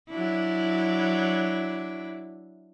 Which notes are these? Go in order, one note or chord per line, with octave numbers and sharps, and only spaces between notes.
F#3 D4 E4